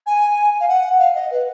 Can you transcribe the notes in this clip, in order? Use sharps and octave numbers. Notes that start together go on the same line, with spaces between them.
G#5
F5
F#5
F5
D#5
B4